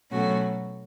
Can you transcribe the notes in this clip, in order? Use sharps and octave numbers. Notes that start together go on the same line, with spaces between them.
B2 F#3 A3 C#4 F#4